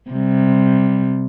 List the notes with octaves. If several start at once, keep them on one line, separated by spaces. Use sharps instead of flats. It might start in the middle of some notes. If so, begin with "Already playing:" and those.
C3 G3